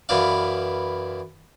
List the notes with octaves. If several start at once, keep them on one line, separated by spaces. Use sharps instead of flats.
F#2 E3 B3 D4 F5